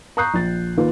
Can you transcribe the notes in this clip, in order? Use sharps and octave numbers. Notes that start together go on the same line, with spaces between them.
A#5 C#6 D#6 F#6 G6 C7
A#1 A6
D#3 A#3 F4 B4